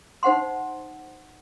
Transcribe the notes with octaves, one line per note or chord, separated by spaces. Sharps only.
D#4 C5 F#5 C6